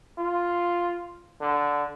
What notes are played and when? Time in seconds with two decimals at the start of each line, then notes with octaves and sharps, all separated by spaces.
0.18 F4
1.41 D3